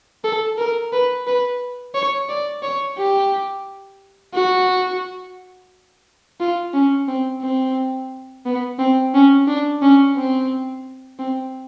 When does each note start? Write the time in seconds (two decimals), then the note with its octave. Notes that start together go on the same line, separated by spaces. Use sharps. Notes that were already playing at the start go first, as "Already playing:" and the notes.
0.24 A4
0.58 A#4
0.93 B4
1.27 B4
1.95 C#5
2.29 D5
2.63 C#5
2.97 G4
4.34 F#4
6.40 F4
6.73 C#4
7.08 C4
7.42 C4
8.46 B3
8.79 C4
9.14 C#4
9.48 D4
9.82 C#4
10.17 C4
11.19 C4